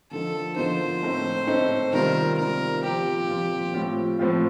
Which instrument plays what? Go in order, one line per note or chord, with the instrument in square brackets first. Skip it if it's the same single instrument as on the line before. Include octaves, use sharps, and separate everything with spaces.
[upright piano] D3 F3 A#3 D#4 [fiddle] A4
[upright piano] D3 F3 A#3 D#4 [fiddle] C5
[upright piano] A2 A3 C4 D#4
A2 A3 C4 D#4
[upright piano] C3 D#3 G3 C4 F4 [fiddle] A#4
[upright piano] C3 D#3 G3 C4 F4 [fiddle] A#4
[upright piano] A#2 F3 C4 F4 [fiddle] G4
[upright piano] A#2 F3 C4 F4
A2 F3 C4 F4
A2 F3 C4 F4